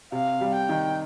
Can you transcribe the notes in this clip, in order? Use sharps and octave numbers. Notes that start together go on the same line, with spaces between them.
C3 F5
G3
G5
D#3